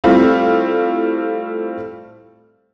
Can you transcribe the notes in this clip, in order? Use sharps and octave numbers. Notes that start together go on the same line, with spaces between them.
G3 A3 C4 E4 F4